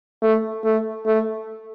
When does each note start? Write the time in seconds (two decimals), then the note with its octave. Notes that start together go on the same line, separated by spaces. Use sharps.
0.22 A3
0.64 A3
1.06 A3